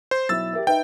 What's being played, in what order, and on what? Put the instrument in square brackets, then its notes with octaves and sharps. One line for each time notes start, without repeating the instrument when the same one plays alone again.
[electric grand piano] C5
[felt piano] B1 E4 [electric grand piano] E6 A6
[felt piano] G4 A#4 E5
[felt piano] D#4 B4 E5 [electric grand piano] G5